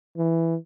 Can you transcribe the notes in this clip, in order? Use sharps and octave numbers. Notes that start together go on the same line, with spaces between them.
E3